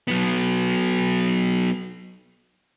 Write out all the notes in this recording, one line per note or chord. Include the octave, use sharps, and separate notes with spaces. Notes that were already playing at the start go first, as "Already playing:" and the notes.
F#3 B3